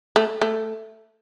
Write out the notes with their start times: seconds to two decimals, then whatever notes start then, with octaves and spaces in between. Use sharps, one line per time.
0.16 A3
0.41 A3